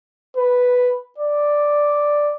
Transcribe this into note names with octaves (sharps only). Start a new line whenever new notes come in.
B4
D5